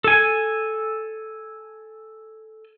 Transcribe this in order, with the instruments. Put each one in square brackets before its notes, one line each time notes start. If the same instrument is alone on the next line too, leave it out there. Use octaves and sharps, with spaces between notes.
[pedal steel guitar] A4 G#5